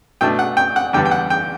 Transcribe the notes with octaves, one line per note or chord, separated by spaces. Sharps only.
B2 A3 D4 G5
F#5
G5
F#5
E2 D3 G3 B3 D4 G5
G5
F#5
G5